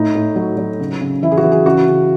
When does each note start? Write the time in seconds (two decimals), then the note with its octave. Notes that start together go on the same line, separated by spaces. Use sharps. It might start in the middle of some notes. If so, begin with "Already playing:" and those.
Already playing: A2 D#4
0.15 A2
0.36 F#3
0.57 F#3
0.80 C#3
1.01 C#3
1.22 E3 E4
1.32 G#4
1.37 F#4
1.44 E3
1.52 G#4
1.65 C#3 F#4
1.87 C#3